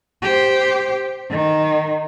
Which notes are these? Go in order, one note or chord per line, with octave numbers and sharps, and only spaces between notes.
G4 C5
D#3